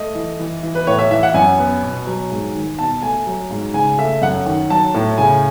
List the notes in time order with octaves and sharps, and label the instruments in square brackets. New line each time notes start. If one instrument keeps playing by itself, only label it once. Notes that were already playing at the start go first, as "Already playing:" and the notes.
Already playing: [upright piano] A3 D#5
E3
E3
E3
B4
A2 C#5
E5
E3 E5
F#5
F#2 G#5
B3
B2
F#3
G#2
D#3
B2 A5
A3 G#5
F#3
G#2
C#3 G#5
A3 E5
F#2 F#5
D#3
F#3 A5
A2
C#3 G#5